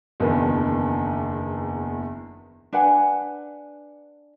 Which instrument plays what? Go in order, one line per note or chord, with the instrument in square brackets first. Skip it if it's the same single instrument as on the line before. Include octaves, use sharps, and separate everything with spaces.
[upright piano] F#1 E2 D#3 D4 B4
[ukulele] D4 B4 F#5 G#5